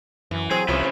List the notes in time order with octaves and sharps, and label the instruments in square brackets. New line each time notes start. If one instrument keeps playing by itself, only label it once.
[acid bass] F#2 [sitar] E3
[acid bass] F#3 [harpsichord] C4 [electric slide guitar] G#4
[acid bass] C2 [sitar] C3 [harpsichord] F3 [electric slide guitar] C#4 E4 B4